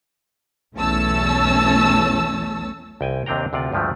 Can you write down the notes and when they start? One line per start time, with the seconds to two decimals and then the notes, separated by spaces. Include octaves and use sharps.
0.75 B1 E2 A3 C#4 A5 E6
3.01 C2 G5 G#5
3.26 D#2 C3 C4 D4 G5 A#5
3.53 D2 C3 F4 D5
3.72 D2 G2 F3 G#3 A3